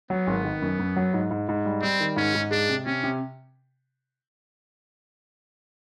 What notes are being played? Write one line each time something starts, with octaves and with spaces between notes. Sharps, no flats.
F#3 B3
G#1
D#3
F#2
F#2
F#3
G#2
G#2
G#2
G3
G3 C4
D#3
G#2 C#4
G#2
G#3 D4
C3
C3 C#4
C3